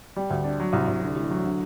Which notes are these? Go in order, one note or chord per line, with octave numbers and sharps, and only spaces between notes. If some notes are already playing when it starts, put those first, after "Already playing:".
G3
D2
D4
F#3
C2
C2
D3
A1
F#3
D3